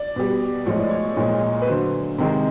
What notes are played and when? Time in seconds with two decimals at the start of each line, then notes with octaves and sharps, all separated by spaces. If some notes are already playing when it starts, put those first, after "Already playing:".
Already playing: D5
0.16 B2 G3
0.66 A2 F3 G#3 C#5
0.80 D5
0.91 C#5
1.17 A#2 F3 G#3
1.62 B4
1.67 D3 F#3 C5
2.18 C3 D#3 G#3